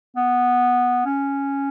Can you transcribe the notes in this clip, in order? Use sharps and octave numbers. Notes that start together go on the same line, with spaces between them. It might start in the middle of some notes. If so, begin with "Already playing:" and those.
B3
C#4